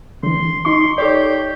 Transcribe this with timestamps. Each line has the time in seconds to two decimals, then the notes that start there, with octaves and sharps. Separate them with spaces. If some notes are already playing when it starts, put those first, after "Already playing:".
0.23 D3 E3 C6
0.39 G#1
0.65 D#4 C6 C#6
0.98 G4 A4 C#5 D5